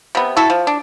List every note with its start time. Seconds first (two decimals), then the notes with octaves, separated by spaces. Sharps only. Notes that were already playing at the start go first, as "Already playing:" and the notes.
0.15 C3 B3
0.37 E4 F#4 A4
0.50 F3
0.67 D4